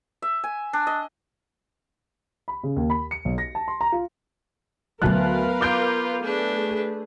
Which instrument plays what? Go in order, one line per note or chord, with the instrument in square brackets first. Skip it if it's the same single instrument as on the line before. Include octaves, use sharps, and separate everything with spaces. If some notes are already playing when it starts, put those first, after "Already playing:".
[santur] E5
G#5
D4
D#5
[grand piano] B5
C#3
D#2
B5
C#7
B1
A#6
A5
C6
A#5
F4
[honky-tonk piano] D2 A5 F#6 [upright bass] F#3 B3 [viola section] A#4 B4 F5
[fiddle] F4 [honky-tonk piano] D6 G6 D7
[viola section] A3 G#4 [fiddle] D4 B4